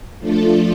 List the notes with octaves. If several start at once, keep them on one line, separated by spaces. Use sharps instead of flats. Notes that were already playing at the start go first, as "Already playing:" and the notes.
F3 A3 D4 F4 A4